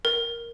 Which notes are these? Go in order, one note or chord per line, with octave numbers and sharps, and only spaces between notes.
A#4